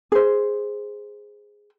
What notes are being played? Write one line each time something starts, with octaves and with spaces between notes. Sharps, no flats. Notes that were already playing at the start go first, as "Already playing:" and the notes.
G#4 C5